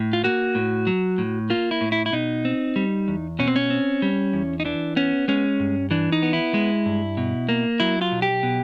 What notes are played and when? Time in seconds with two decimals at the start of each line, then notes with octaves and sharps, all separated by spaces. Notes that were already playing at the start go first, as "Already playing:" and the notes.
Already playing: A2
0.13 F4
0.24 A#3 F#4
0.55 A2
0.87 F#3
1.18 A2
1.50 A#3 F4
1.71 E4
1.81 A2
1.92 E4
2.06 E4
2.12 B2 D#4
2.45 C4
2.76 G3
3.08 E2
3.39 B2 C#4
3.48 C4
3.56 C#4
3.70 C4
4.02 G3
4.33 E2
4.60 D#4
4.65 E3 D4
4.96 B3 C#4
5.28 G#3 C#4
5.60 G2
5.91 E3 D4
6.12 D#4
6.23 B3
6.33 E4
6.54 G#3
6.86 G2
7.17 B2
7.49 A#3
7.80 F#3 E4
8.01 F4
8.12 B1
8.22 G4
8.43 B2